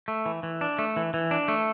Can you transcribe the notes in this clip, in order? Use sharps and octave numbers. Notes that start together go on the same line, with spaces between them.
A3
E3
E3
D4
A3
E3
E3
D4
A3